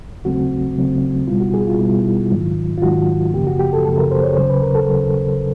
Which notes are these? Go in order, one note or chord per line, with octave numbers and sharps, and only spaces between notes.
D#2 C#3 F#3 A3 C4 F#4
D#2 C#3 F#3 A3 C4
B2 G3 B3 E4 F4
F#4
G#4
F4
B2 G3 B3 E4
G#2 D#3 F#3
F4
G#2 D#3 F#3 F#4
F#2 C#3 F3 A#3 G4
F#4
G4
A4
F#2 C#3 F3 A#3 A4
A#4
C5
C#5
D#2 C#3 F#3 C5
B4
A#4
A4
D#2 C#3 F#3